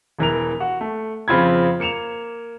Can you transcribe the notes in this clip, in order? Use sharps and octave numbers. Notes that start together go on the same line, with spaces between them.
E1 E3 A#4 F7
F#4
A3
F2 C#3 C4 F4 B5 G#6
A#3 C#7 E7 F7